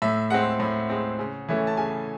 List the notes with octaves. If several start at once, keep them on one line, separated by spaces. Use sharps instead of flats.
A2 E5
G#3 C4 F#5
A2
G#3 C4
C#3
E3 A3 C#4
A5
C#3 G#5